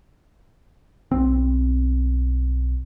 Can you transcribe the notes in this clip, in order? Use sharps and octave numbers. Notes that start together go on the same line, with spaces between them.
B1 C4